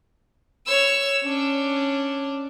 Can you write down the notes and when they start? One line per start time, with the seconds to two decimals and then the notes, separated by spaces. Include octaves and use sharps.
0.67 C#5 E6
1.23 C#4 D4